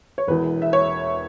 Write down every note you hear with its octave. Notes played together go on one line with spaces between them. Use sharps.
C#5
E1 E2 E3 B4
E5
C#5